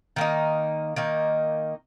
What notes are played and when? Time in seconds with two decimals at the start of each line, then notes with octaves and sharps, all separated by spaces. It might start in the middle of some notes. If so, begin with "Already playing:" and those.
0.16 D#3 A#3 D#4
0.96 D#3 A#3 D#4